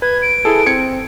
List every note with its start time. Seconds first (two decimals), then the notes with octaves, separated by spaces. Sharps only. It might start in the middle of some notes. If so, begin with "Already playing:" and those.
0.02 B4 G#6
0.22 D7
0.45 E4 G#4 A4
0.67 C4 G#6 C#7